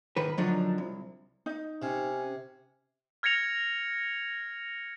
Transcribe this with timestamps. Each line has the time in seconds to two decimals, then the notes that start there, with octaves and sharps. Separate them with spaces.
0.16 B1 G#2 D#3 B4
0.37 F#2 D3 F3 F#3 D4 D#4
0.78 C2
1.46 D#4
1.82 C3 C#4
3.23 F6 G#6 A#6 C#7 F7